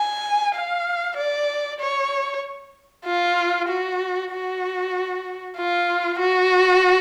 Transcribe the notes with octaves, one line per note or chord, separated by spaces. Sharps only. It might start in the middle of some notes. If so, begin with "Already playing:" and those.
Already playing: G#5
F5
D5
C#5
F4
F#4
F#4
F4
F#4